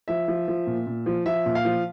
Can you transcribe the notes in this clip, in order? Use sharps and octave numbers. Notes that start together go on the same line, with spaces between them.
F3 E5
F3
F3
A#2
A#2
F3
F3 E5
A#2
F5
F3